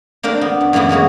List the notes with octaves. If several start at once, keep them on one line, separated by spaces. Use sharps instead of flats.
A#3 C4 D4 A#4
B3
F#2
F#2 E3 A#3 B3 E4
C#3 G#3 A#3 F#4